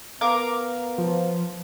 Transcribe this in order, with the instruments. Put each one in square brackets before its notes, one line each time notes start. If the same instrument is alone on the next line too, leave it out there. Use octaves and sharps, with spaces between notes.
[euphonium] B3 [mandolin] A#4 F5 D6
[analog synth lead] F3